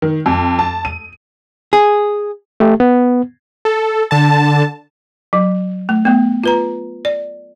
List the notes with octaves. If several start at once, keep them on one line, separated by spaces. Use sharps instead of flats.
D#3
F2
A5
D#7
G#4
A3 G4
B3
A4
D3 A5
F#3
A3
A3 B3
F4 B4 A#5
D5